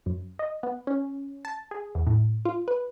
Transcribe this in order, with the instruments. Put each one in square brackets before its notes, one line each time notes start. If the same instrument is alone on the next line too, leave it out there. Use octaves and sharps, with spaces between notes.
[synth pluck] F#2
D#5
B3
C#4
A5
G#4
E2
A2
F4
B4